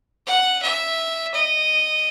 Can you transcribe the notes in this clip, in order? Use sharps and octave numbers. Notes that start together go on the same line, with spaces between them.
F#5
E5
D#5